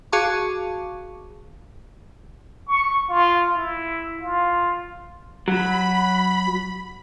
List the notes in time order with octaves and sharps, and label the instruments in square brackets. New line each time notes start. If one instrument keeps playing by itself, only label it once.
[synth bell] F#4 G#4 F5 A5 C#6 D6
[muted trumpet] C#6
F4
E4
F4
[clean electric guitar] F#3 [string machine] B5